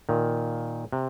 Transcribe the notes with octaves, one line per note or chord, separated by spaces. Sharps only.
A#2 D#3
C3